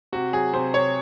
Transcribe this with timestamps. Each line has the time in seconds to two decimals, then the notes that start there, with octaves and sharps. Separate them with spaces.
0.13 C3 F#4
0.33 F#3 G#4
0.53 C3 C5
0.74 C3 C#5